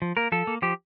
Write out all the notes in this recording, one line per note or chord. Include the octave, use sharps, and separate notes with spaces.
F3
A#3 A#4
F3 A4
A#3
F3 G4